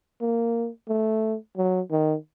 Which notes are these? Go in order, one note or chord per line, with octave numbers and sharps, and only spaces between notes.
A#3
A3
F#3
D#3